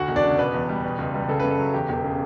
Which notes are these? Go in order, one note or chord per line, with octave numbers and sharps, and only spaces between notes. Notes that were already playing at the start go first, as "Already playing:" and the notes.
Already playing: D2 F#4 F#5
E1
D4 D5
C#3
B2 B3 B4
E2
G3
B2
C#2
G3
C#3 A4
F#2 B4
A4
F#3
E2 G4
E1
C#3